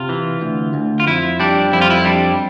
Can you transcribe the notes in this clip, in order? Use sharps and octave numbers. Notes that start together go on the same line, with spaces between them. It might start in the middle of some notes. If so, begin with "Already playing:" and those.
Already playing: C3 F4
E3
D2
D2
F4
F2 E4
G3 D4
F2 E4
F4
E4
G3 D4